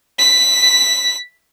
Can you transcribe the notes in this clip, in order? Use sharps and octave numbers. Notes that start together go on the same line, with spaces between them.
B6